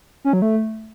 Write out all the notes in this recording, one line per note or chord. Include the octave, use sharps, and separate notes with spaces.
C#4
F#3
A3